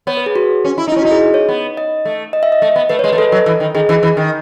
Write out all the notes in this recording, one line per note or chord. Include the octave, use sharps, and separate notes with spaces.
B3 C#5
B4
G#4
F#4
C#4
E4
D#4
E4
C#4
F#4
D#4
G#4
C#5
B3
D#5
A3
D#5
E5
D#5
A3
B3
A3 B4
C#5
G#3
B4
A3
G#3 A4
F#3
E3
D#3
D#3 G#4
E3
E3
D#3